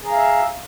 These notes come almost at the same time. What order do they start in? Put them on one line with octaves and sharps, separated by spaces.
G#4 A#5 F5 E5